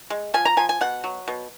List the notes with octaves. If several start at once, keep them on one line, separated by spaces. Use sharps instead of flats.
G#3
F3 G#5
A#5
F3 G#5
G#5
B2 F#5
F#3
B2